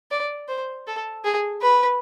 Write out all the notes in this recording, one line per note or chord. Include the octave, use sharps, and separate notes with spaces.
D5
C5
A4
G#4
B4